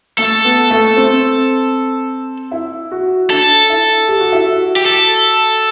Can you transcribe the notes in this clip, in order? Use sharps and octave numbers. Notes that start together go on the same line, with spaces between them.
A3 A4
B3
A3
C4
E4
F#4
D4 A4
E4
G4
F#4
E4
F#4
G4
A4